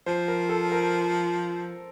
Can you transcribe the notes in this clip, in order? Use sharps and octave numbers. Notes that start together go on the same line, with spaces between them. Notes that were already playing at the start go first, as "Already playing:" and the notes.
F3 C5
A#4
A4
A#4